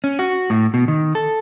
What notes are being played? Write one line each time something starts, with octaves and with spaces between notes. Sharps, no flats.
C#4
F#4
A2
B2
D#3
A4